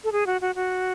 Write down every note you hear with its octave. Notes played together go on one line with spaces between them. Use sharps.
A4
G#4
F#4
F#4
F#4